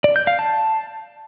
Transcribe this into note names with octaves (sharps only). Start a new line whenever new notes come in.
D5
G6
F5
A5